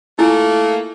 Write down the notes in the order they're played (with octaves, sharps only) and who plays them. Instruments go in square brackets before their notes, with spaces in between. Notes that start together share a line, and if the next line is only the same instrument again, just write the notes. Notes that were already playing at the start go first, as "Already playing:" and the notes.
[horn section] A3 A#3 [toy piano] E4 F4 G#5